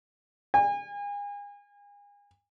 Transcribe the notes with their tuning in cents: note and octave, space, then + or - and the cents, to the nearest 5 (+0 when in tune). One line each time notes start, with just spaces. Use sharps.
G#5 -35